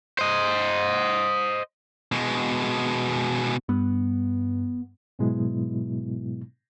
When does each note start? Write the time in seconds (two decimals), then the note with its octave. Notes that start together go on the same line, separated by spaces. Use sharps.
0.19 C5 D#5
2.12 B2 G#3
3.69 G2 B3
5.19 G#2 B2 F#3 G#3 B3 E4